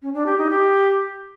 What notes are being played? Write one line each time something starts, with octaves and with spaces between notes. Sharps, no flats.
C#4
D4
G4
D#4
G4